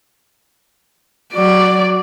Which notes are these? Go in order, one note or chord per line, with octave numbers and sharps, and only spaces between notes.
F#3 D5